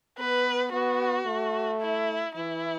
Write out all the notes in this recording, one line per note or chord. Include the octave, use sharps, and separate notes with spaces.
B3 B4
B3 F#4
A3
E4
E3 E4